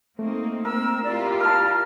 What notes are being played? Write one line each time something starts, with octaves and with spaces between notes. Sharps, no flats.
A3 A#3 C4 D#4
A#3 C4 A#4 E6
E4 F4 G4 D5
A#4 A5 F6